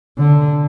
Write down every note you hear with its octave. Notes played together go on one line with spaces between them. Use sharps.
D3